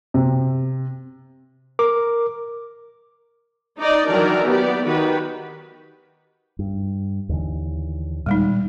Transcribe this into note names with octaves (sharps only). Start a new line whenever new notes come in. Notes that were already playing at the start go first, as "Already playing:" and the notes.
C3
A#4 D6
D#4 D5 D#5
D#3 E3 F#3 D4 A#4 D5
B3 G4 D5
D#3 F#4 G4 B4
G2
D#2 D3 E3
A#2 D#3 G3 G#3 D#4